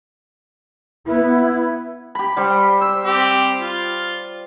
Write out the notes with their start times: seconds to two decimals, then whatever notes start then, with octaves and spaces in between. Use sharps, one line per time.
1.06 B3 E4
2.15 G4 B5
2.37 G3 G4 C5
2.81 C5 E6
3.05 C4 G4
3.58 F4